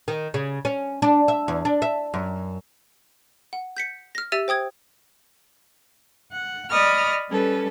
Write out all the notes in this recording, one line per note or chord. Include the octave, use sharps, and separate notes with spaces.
D#3
C#3
C#4
D4
E5
E2
D4
E5
F#2
F#5
G6 B6 C#7
F6 A#6
G4 E5 E6 A6 D#7
C5 G5 D#6 G#6
F#5
D5 D#5 B5 C#6 D#6 F6
G3 C#4 A4 B4